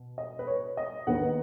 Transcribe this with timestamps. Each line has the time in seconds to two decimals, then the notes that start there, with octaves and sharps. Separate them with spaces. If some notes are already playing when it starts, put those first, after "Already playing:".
Already playing: B2
0.18 D#5
0.39 B4
0.47 C#5
0.77 D#5
1.07 D#2 D#3 B3 F#5